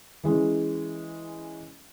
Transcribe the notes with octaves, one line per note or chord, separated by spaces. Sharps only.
E3 G#3 C#4